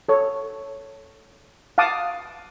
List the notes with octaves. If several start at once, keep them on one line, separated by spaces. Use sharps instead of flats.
A4 C#5
F5 F#5 A5 D6 D#6